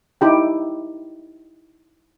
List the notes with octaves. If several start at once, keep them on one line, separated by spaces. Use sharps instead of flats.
D#4 E4 G4 G5